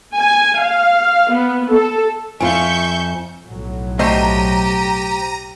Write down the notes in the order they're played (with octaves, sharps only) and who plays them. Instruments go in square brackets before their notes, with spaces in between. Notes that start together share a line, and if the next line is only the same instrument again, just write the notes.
[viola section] G#5
F5
B3
A4
[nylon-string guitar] F2 F4 [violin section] E5 C#6 G6 [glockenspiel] G#5
[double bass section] B1 A2 F#3
[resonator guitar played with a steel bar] A3 C5 D#5 [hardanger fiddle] G4 [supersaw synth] A#5 D#7